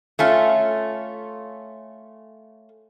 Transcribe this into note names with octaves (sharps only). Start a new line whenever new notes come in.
A3 C#4 F4